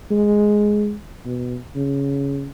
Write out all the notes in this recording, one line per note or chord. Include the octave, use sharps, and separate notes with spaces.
G#3
B2
C#3